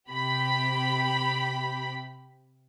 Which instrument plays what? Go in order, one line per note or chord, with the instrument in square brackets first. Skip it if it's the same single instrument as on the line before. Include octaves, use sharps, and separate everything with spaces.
[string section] C3 G4 B5